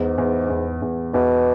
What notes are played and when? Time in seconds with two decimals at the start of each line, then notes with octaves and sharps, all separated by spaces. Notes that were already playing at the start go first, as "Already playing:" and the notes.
Already playing: E2 G#2
0.18 E2
0.50 E2
0.82 E2
1.14 E2 B2